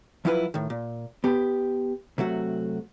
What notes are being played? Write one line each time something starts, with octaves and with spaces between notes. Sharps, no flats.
F3 F#3 E4 F4 G4 B4
A2 D#3
A#2
B3 G4
C3 F#3 A3 F#4